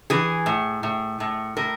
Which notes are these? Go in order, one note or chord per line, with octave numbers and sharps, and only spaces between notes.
E3 G#4
A2
A2
A2
A2 A#4